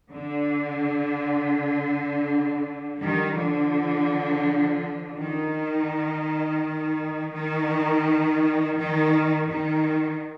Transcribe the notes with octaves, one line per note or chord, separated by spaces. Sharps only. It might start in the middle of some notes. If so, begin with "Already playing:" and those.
D3
D#3 G3
D3 F3
D#3
D#3
D#3
D#3